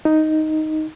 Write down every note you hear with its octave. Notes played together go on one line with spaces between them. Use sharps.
D#4